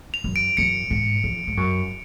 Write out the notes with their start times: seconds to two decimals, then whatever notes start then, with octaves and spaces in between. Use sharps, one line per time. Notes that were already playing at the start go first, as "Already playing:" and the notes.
0.14 F7
0.24 F#2
0.36 D7
0.57 F#2 C#7
0.90 G#2
1.24 F2
1.47 G#2
1.57 F#2